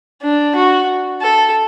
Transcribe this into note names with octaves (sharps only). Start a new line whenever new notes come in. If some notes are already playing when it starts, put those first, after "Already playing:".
D4
F#4
A4